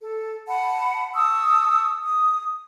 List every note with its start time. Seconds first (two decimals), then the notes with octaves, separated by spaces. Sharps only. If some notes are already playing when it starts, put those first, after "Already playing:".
0.01 A4
0.48 F#5 A5 B5
1.15 A5 C#6 D#6 E6
2.03 D#6